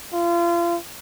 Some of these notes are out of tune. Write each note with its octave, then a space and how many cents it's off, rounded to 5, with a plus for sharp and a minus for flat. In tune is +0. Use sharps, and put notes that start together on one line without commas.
F4 -35